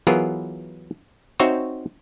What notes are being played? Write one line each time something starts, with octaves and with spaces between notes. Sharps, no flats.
E3 F#3 B3 F4 G#4 A#4
C4 D#4 F#4 C5 C#5 E5